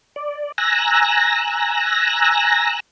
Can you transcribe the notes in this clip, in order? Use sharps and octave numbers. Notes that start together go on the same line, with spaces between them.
D5
G#5 A#5 E6 F#6 A#6